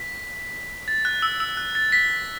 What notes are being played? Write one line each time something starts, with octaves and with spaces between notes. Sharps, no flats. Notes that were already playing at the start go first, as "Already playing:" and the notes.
Already playing: B6
A6
F#6
E6
E6
F#6
A6
B6